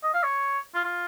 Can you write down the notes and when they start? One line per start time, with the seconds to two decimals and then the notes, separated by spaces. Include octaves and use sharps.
0.03 D#5
0.14 F5
0.23 C#5
0.74 F4
0.84 F4